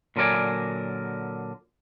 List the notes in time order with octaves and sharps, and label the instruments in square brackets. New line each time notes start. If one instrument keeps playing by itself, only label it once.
[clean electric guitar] A#2 D3 F#3 A#4 D5 G#5